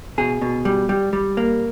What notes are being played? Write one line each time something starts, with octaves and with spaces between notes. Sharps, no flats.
B2 G#4
B2
G3
G3
G3
A#3